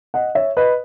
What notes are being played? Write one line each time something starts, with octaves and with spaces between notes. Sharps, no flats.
D#5 F#5
C#5 E5
B4 D#5